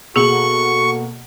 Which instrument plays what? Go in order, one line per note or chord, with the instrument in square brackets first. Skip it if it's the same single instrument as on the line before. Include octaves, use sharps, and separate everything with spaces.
[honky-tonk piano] B2 A#3 F#7 [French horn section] F#4 A4 [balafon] G#4 [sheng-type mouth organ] C#6